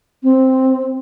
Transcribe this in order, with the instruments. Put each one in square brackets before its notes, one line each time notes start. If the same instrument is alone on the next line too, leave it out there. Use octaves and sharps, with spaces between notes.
[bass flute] C4